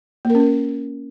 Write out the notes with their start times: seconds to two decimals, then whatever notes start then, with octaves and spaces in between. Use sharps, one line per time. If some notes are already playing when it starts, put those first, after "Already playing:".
0.25 A#3
0.30 A#4
0.35 C#4
0.40 A#4